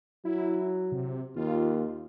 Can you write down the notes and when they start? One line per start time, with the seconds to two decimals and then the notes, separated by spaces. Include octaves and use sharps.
0.25 F#3 E4
0.92 C3
1.36 D#2 F4